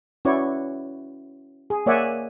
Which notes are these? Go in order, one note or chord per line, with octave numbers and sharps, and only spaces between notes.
C#4 E4 F#4 B4 C#5 D5
G#4
A#3 C#5 D5 E5 F#5 G#5